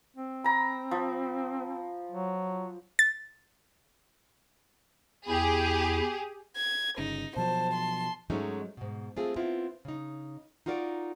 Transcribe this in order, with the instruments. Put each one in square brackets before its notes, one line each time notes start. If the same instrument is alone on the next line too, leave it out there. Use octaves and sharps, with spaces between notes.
[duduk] C4
[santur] A#5 B5
F3
[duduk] F#3
[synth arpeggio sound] A6
[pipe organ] E2 E4 [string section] G4 G#4
[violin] G#6
[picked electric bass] G1 C#3 [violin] D#4
[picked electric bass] B2 F3 F#3 [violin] C5 [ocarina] A5
[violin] C6
[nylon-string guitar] G#2 F#3 G#3 A3 C#4 D#4
G#2 B2
A3 C4 F4 G#4
B3 C4 E4 F4
C#3 D#4
D#4 F4 F#4 A#4 D5